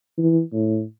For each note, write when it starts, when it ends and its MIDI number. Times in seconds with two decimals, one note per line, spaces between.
0.18 0.40 52
0.53 0.83 45